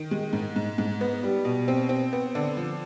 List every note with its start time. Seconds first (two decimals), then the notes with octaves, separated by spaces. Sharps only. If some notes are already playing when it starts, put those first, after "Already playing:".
Already playing: D#3
0.11 G#3
0.33 G#2
0.56 G#2
0.78 G#2
1.01 B3
1.23 G3
1.45 B2
1.68 C4
1.89 C4
2.13 B3
2.35 D3
2.57 F3